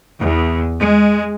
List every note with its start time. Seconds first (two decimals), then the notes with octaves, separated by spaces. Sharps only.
0.19 E2
0.79 G#3